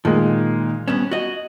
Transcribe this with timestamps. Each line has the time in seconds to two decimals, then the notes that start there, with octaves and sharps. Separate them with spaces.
0.05 A#2 D#3 G#3
0.88 G2 B3 C#4 E7
1.11 F#4 D#5